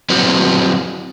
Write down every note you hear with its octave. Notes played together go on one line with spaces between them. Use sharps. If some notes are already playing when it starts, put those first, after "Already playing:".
F#3 C4 E4 F#4 B4 C5